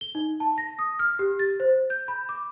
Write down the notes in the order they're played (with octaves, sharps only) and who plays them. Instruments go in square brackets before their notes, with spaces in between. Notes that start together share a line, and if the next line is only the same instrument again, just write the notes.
[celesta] G7
D#4
A5
A#6
D#6
F6
G4
A6
C5
G6
B5
D6